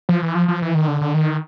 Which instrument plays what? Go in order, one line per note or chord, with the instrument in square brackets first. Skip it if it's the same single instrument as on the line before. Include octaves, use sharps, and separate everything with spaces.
[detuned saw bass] F3
E3
F3
F3
E3
D#3
D3
D3
D#3